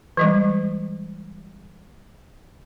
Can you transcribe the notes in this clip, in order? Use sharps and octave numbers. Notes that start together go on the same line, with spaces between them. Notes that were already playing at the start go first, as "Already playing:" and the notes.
E3 G3 G#3